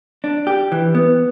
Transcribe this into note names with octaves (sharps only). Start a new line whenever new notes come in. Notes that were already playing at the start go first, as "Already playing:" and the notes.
D4
G4
E3
B3